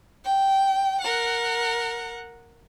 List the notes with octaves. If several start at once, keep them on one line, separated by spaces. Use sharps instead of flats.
G5
A#4 F#5